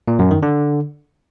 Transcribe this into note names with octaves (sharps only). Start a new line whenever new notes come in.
A#2
F#2
D#3
D3